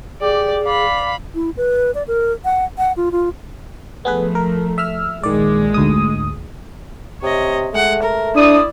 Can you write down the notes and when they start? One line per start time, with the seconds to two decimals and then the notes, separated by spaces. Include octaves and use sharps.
0.22 G4 G#4 D5
0.64 D5 F5 B5
1.35 E4
1.57 B4
1.95 D5
2.08 A#4
2.45 F#5
2.78 F#5
2.97 F4
3.12 F4
4.05 F3 A3 B3 G#4 B4
4.35 A#4
4.78 E5 E6 F6
5.23 A#1 D#3 G#3 D5
5.74 D2 G#2 D#6
7.22 C3 C#5 D#5
7.73 G#3 A3 F#5
8.03 A#4
8.35 D4 E4 D5 D#6